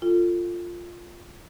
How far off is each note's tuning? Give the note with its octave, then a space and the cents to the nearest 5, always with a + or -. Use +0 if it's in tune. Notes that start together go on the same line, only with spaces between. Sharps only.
F4 +0 A4 +25